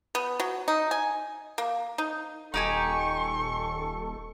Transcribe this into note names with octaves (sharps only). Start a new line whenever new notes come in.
B3
F#3
D#4
G#5
A#3
D#4
D#1 D#4 G4 A4 G#5 C#6